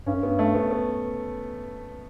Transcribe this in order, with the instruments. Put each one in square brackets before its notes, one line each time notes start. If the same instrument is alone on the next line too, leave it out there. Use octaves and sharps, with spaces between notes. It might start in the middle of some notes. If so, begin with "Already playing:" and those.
[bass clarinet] G2 [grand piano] C#4
[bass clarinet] F#2
[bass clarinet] G2 [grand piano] B3
[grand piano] A3
B3
B3